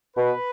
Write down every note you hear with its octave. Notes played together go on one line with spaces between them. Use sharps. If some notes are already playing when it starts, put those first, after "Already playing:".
B2 B4